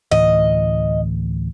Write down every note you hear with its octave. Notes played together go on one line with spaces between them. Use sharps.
D2 A2 E3 D#5